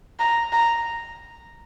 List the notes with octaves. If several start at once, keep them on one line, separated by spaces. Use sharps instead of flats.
A#5
A#5